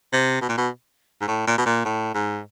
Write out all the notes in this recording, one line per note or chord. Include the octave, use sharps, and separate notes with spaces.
C3
B2
A#2
B2
G#2
A2
A#2
B2
A#2
A2
G#2